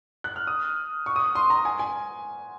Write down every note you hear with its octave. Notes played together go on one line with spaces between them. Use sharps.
F#6
F6
D#6
C#6
D#6
C6
A#5
G#5
G#5